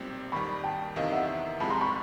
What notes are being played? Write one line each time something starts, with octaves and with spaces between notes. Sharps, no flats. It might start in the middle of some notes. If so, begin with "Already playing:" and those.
Already playing: B1 A#2 G3 C4
D#2 D#3 G3 B5 C#6
G5 A5
E2 C3 D#3 D#5 F5
E5 F#5
C2 C3 F3 G#3 A5 B5
A#5 C6
B5 C#6